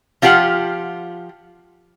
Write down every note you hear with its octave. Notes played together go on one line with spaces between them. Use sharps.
F3 F4 G4 C5 F#5